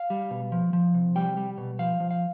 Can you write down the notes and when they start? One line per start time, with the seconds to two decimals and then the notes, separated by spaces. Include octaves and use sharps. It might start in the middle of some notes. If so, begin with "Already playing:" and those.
Already playing: F5
0.10 G3
0.31 B2
0.52 F3
0.73 F3
0.94 C3
1.16 G3 G5
1.37 G3
1.58 B2
1.79 F3 F5
2.00 F3
2.11 F5